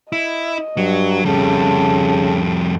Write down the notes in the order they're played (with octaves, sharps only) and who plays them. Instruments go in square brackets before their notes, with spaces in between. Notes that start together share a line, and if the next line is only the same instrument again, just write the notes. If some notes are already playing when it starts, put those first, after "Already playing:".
[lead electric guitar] E4 [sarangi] D#5
[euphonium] G2 [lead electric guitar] F#3
[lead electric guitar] F2 G3 [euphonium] C#3 [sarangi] A4